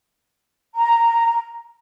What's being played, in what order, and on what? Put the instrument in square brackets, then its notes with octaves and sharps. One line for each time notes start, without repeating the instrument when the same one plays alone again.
[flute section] A#5